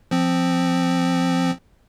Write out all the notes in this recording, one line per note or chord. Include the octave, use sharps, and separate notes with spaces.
F3 C4